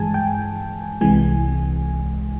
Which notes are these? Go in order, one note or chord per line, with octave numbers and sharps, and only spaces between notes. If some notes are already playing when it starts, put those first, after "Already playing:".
Already playing: G2 E3 G#3 G#5 A5
G5
C2 C3 E3 G#3 G#5